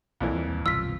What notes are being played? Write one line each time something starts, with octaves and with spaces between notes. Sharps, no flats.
B1 F2 A#2 E3
D#2 G3 C4
E1 C2 G2 F4 E6 B6